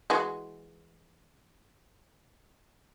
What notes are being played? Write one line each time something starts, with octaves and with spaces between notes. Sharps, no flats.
E3 G#3 F#4